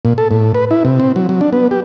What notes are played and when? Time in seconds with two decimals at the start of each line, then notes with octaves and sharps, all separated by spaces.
0.05 A#2
0.18 A4
0.31 A2
0.54 B4
0.71 E4
0.85 C3
1.00 C4
1.16 F#3
1.29 F#3
1.41 D4
1.53 B3
1.71 G4